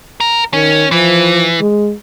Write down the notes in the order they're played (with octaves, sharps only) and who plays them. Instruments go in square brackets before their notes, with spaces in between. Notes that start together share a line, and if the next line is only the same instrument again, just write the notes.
[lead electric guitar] A#4
[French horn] D#3 [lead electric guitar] C#4
[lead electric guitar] E3 [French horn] F3
[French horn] G#3